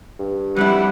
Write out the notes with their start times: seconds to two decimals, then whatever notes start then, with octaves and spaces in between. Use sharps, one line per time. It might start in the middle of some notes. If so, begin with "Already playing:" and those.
0.19 G2
0.56 F2 F#3 G3 E4 F#5